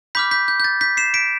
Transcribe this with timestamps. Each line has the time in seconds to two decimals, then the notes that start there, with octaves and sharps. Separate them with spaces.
0.15 B5 D6 F6 G6 B6
0.31 G6 B6
0.48 G6
0.60 G6
0.64 A6
0.81 G6 B6
0.97 C7 E7
1.14 B6 D7